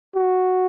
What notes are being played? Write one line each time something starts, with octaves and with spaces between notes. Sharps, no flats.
F#4